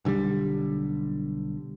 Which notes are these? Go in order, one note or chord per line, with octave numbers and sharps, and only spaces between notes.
B1 D3 E3 G3